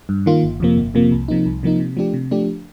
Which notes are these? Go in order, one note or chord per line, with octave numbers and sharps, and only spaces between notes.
G2
D#3 A#3 F4
G1
F2 C3 F3 A#3
G1
F2 C3 F3 A#3
C2
C3 F3 A#3 D#4
C2
C3 F3 A#3 D#4
C3
F3 A3 D4 G4
C3
F3 A3 D4 G4